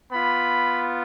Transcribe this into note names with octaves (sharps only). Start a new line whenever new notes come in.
B3 F4 B5